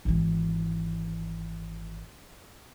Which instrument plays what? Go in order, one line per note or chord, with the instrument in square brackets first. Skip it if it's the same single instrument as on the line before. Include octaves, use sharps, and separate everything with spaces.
[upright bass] G#1 E3